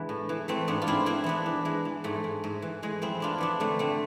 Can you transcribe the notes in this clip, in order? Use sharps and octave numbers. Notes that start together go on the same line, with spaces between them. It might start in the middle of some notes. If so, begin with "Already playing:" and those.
Already playing: E3 G#3 B3 D4
A2
E3
E3 A3 C4
G#2 B3 D4
F4
G#2 C4 E4
E3 C4 E4
E3 B3 D4
E3
E3 G#3
E3
G#2 A3
G#2
G#2
E3
E3 G#3
F2 C4 E4
E3 D4 F4
E3 B3 D4
D3 A3 C4
D3 A3 C4